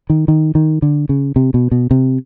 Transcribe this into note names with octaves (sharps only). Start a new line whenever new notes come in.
D#3
D#3
D#3
D3
C#3
C3
B2
B2
C3